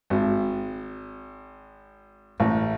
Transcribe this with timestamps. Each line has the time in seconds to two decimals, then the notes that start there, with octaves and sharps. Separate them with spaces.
0.10 G#1
2.40 A1